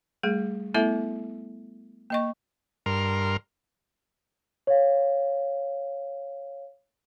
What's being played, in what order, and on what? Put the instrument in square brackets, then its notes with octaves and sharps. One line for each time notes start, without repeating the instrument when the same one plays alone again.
[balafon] G3 A3 G#4
A3 B3 E4 A4 E5
A#3 D#5 C#6
[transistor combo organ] G2 A#4 C6 F6
[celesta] C#5 F5